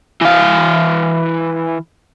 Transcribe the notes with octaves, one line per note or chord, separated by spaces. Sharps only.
E3 F5